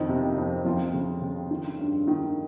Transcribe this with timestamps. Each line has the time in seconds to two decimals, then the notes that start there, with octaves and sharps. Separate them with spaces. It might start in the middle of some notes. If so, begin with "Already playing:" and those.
Already playing: F2 D#3 D#4
0.09 C3
0.38 F2
0.65 F2 F3 F4
0.94 C#3
1.22 C#3
1.51 D#3
1.79 G2
2.08 D#3